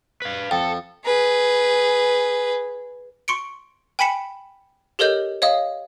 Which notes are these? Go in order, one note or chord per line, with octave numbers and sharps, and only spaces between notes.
B4 F5
F2 A4 G5
G#4 B4
C6 C#6 C#7 D7
G5 G#5 B5 B6 C#7 E7
G4 A4 A#4 C#5 D#5 G6
C#5 D#5 F5 D#6